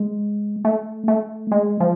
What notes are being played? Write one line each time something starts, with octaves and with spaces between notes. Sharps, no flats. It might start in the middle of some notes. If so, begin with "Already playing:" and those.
Already playing: G#3
A3
A3
G#3
F3